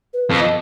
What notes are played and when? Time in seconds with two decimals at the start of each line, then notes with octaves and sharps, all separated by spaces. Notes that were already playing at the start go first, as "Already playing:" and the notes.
0.13 B4
0.30 F2
0.39 D#5